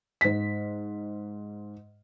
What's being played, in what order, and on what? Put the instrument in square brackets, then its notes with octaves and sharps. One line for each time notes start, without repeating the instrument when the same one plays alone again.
[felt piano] G#2 B6